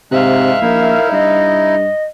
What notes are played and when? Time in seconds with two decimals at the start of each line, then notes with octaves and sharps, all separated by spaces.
0.12 G#2 C3 G#3 E5 F5 F#6
0.62 A#1 D#4 E4 A#4
1.12 G2 D#5